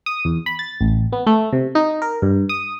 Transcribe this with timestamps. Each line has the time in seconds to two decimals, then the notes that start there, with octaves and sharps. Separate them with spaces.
0.06 D#6
0.25 E2
0.46 B5
0.59 A6
0.81 A1
1.12 B3
1.27 A3
1.53 C3
1.75 D#4
2.02 A#4
2.22 G2
2.49 D#6